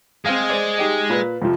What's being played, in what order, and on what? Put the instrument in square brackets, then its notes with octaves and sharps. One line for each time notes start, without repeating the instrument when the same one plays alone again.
[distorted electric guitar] G#3 G#4 [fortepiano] C4 F5
[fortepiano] C5 D5
D#4 G4 D#5
A#2 B4
F2 C3 F3